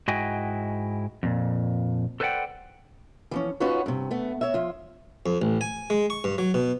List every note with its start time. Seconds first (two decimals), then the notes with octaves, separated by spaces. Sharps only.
0.08 G#2 E4 F#4 D#5 G5 G#5
1.23 F2 A#2
2.20 A4 B4 C5 D5 F#5 G5
3.31 E3 F3 C#4
3.60 C#4 D#4 F4 F#4 B4 C#5
3.86 G2 C3
4.11 A3 B3
4.41 C#5 E5
4.54 F3 F4
5.26 F2
5.42 A1
5.61 G#5
5.90 G#3
6.10 C#6
6.24 G2
6.38 F#3
6.54 B2